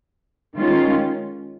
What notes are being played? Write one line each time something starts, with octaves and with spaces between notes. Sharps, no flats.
D#3 G#3 C#4 F4